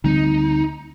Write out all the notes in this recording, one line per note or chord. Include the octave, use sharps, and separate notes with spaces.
D2 D3 G3 C4 D#4